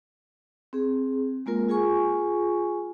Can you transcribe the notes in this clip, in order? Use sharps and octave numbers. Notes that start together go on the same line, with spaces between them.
C4 G#4
G#3 A#3 F4 A#4
F4 G#4 G#5 C#6